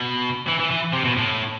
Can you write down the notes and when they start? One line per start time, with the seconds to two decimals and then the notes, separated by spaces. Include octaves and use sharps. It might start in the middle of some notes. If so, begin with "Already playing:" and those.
Already playing: B2
0.48 E3
0.60 E3
0.71 E3
0.93 C3
1.05 B2
1.17 A2